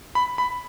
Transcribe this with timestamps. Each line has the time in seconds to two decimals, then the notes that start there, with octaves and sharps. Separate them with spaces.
0.15 B5
0.38 B5